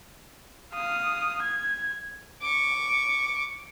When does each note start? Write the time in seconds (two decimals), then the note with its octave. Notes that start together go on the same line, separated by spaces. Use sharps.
0.74 F5 D#6
1.42 G#6
2.42 C#6 D6